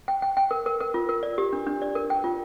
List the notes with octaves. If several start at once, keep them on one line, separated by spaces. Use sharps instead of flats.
G5
G5
G5
A#4
A#4
A#4
F4
A#4
D5
G4
D4
D4
D5
A#4
G5
F4